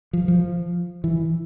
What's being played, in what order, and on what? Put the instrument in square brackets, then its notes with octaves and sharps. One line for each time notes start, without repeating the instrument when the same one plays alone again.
[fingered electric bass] F3
F3
E3